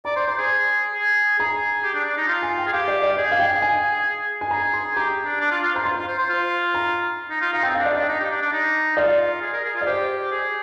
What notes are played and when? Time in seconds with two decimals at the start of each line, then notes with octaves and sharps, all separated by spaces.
0.05 D5 A#5
0.16 C5
0.27 C5 A#5
0.38 G#4
0.94 G#4
1.39 G#4 A#5
1.83 G4
1.94 D4
2.05 D4
2.17 D#4
2.28 F4
2.43 G#5
2.58 G5
2.67 G#4
2.72 G4 F5
2.88 D5
3.02 D5
3.17 G#4 D#5
3.31 F5
3.40 G5
3.62 G#5
4.41 G#5
4.51 G#4 A#5
4.73 C6
4.96 G4 A#5
5.25 D4
5.41 D4
5.51 F4
5.63 F4
5.74 C5 A#5
5.85 F4 C6
5.97 F4
6.07 C5
6.19 C5
6.29 F4
6.74 A#5
7.30 D#4
7.42 F4
7.53 D#4 F5
7.63 C4 G5
7.75 F5
7.78 D4
7.85 D5
7.94 D4 D#5
8.08 D#4
8.20 G4
8.31 D4
8.42 D4
8.53 D#4
8.97 F4 D5
9.42 G#4
9.53 A#4
9.64 G#4
9.75 F4
9.81 D5
9.86 G4 C5
10.32 G#4